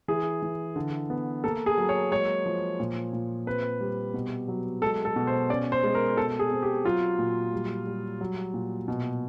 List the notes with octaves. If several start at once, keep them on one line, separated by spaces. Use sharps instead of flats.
E3 G#4
E3
D3
B3
A#3 A4
G#4
F#3
C#5
G#3 C#5
F3
A#2
A#2
C4 B4
G3
B2
F#3
G#3 A4
A4
B2
C5
C#4 D5
C5
G#3
A#4
B2 A4
G#4
C4
G4
F#3 F4
A#2
G3
G3
F#3
A#2
B2